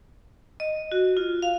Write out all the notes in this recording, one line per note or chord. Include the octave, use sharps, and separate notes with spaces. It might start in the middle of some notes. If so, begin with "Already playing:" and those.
D#5
F#4
F4
F5